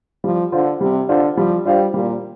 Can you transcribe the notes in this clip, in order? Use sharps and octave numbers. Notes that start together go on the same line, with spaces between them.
F3 G3
D3 D4 F4 C5 F5
C3 G3
D3 D4 F4 C5 F5
F3 G3
G3 D4 F4 C5 F5
A#2 G3